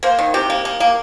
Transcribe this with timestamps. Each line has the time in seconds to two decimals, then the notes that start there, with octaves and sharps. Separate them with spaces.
0.03 A#3 C5
0.19 D#3
0.34 C3 G4
0.50 A#3
0.65 A#3
0.80 A#3